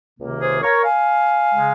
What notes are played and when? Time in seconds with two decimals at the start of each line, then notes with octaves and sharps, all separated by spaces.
0.18 C#2 C3 D#3 A#3
0.40 G#4 C5
0.62 A#4 C#5
0.85 F5 G#5
1.52 C#3 G#3